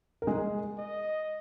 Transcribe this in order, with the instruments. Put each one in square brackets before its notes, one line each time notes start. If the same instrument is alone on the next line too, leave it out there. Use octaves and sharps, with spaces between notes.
[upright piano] A#4
G#3 G#4
[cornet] D#5